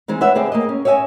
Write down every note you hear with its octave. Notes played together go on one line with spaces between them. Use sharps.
E3 G#3 C4 D#4
B4 C#5 E5 F#5
D3 C4 G#4 D5 G5
A#3 G#4 D#5
C#4
C#5 D#5 E5 F#5 G#5